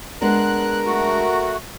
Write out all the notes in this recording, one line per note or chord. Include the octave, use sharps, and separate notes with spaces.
G#3 B3 D4 A#4 F#6
A3 F#4